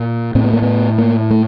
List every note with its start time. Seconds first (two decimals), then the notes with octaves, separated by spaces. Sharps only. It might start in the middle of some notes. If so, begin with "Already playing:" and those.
Already playing: A#2
0.35 A2 C4
0.44 B3
0.53 A#3
0.62 B3
0.98 A#3
1.30 A3